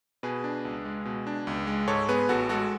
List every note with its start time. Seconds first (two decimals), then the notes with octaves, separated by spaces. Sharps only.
0.23 B2 G#4 B4
0.44 D4
0.65 C#2
0.85 G#3
1.05 B2
1.27 D4
1.47 C#2
1.67 G#3
1.87 G#2 A4 C#5
2.09 B3 G#4 B4
2.29 A1 F#4 A4
2.49 G#3 F#4 A4